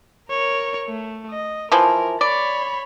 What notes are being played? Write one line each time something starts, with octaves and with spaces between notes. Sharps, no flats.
A#4 C#5
A3
D#5
E3 F3 A#4
C#5 D5 B5